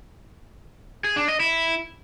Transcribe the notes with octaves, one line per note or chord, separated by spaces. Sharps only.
G#4
D4
D#5
E4